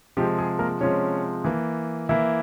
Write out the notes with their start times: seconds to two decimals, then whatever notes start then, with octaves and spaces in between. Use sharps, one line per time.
0.17 C3 F3 G#3 G4
0.38 G#4
0.59 A#3 A#4
0.81 C3 F3 G#3 C#4 C#5
1.44 E3 A#3
2.09 E3 A#3 E4 E5